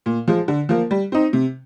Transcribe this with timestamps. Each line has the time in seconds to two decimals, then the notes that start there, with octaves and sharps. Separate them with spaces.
0.06 A#2
0.28 F3 G#3
0.48 D3
0.69 F3 A#3
0.91 G3
1.12 C4 D#4
1.33 C3